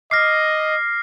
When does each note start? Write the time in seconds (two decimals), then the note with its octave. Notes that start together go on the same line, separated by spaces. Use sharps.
0.11 D#5 D6 F6 A#6 C7